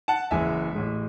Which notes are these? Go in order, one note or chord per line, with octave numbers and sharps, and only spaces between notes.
F#5 A5
F#1 F#2 E3 G#3 E5 G#5
A1 A2 G#3